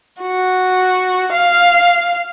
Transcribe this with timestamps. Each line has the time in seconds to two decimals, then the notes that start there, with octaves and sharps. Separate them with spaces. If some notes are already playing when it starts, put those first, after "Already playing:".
0.22 F#4
1.33 F5